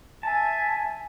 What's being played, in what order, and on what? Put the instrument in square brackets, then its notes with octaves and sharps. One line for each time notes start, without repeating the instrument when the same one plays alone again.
[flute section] E5 G#5 [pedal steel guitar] A5